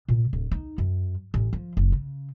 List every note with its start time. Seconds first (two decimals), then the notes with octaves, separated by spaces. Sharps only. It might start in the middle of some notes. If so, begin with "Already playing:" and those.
0.08 A#2
0.33 D1
0.51 D#4
0.78 F#2
1.34 A1
1.53 F3
1.77 F#1
1.92 C#3